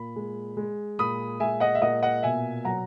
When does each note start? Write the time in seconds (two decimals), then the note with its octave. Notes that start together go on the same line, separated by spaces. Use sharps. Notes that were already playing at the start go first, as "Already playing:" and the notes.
Already playing: A#2 B5
0.16 G#3
0.57 G#3
0.99 A#2 B5 D#6
1.40 G#3 E5 G#5
1.60 D#5 F#5
1.75 E5
1.82 A#2 D#5 F#5
2.02 D#5 F#5
2.23 B2 E5 G#5
2.65 F#3 F#5 A#5